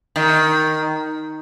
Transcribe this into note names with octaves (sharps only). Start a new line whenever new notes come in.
D#3